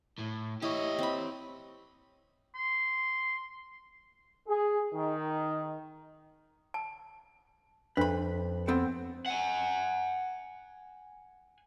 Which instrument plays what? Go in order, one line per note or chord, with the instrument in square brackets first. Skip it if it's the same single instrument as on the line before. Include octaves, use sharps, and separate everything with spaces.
[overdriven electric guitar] A2
[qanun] E4 [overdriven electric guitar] G4 C#5 [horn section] D#5
[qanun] C4 B5
[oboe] C6
[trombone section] G#4
D#3
[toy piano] A5
[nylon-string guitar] F2 [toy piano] D4 [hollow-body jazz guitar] B4 B5
[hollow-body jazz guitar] B3 C4 A4
[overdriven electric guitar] F#5 G#5